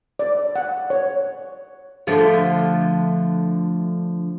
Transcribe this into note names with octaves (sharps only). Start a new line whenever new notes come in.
D5
F#5
C#5
D3 F3 A3